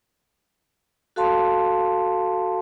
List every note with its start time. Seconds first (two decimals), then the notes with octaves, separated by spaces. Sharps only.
1.16 F#4 A4 F5 A5 C6